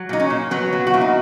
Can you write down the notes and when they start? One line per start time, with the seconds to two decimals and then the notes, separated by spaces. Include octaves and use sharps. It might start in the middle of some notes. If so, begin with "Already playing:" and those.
Already playing: F#3
0.09 A#2 D#4
0.20 C#4
0.30 A#2
0.51 F#3 B3
0.73 F#3
0.87 F#4
0.94 A#2 E4
1.01 D#4